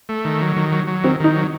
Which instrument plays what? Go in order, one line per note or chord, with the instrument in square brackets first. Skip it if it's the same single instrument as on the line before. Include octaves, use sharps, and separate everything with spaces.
[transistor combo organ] A3
D#3
F#3
D#3
F#3
F#3
[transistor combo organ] D#3 [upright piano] C4
[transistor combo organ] D#3 [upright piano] D#4
[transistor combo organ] F#3